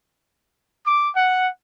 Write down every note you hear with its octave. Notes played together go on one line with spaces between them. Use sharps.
D6
F#5